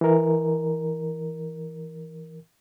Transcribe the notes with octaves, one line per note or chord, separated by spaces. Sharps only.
E3 A#4